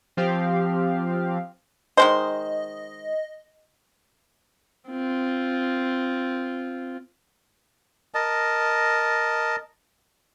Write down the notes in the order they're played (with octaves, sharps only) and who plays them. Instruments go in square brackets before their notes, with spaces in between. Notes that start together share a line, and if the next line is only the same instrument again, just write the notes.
[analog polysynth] F3 C4 G4 F5
[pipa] D#3 G#3 C5 [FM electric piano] D#5
[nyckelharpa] C4 F4
[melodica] A#4 D#5 A5